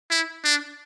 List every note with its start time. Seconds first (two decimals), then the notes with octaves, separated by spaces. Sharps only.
0.10 E4
0.44 D4